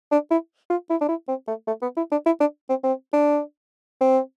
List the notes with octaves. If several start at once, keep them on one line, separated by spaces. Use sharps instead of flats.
D4
E4
F4
E4
D4
E4
C4
A3
A3
B3
E4
D4
E4
D4
C4
C4
D4
C4